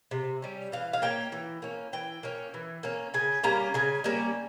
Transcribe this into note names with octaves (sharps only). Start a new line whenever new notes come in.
C3
G3 C#4
E3 F5
F5
A#3 C#4 G5
E3
A#3 C#4
E3 G5
A#3 C#4
E3
A#3 C#4
C#3 G#5
G3 A#3 C#4 A#5
C#3 G#5
G3 A#3 C#4